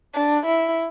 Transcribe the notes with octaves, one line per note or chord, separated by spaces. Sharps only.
D4
E4